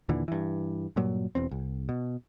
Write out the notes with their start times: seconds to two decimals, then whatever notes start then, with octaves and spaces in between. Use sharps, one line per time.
0.09 D#2 A#2 D3 E3
0.28 G2 E3
0.96 G2 A#2 F#3
1.35 E1 E2 C4
1.51 C2
1.89 B2